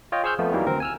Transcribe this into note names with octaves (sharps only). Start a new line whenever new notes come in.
F4 C#5 D#5 G5
G#4 C5 C#6 E6 F6 G6
F2 F3 A3 B3
D#3 E3 F#3 G3 A#3
D2 C4 A#4
G#5 E6 F6